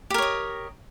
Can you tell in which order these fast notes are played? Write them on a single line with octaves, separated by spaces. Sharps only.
G4 A#4 C#5 D#5